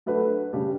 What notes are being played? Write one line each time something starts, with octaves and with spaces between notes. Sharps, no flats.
F#3 A3 D4 F#4 B4
C#3 G3 D4 G4